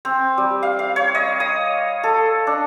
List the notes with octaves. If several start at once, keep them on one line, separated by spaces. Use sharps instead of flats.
C4
G3
F5
F5
C#5
D#5
D#6
A4
D4